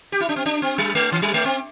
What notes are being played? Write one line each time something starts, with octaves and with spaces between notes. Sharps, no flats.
G4
E4
D4
C4
D4
C4
G3
A3
E3
G3
A3
C4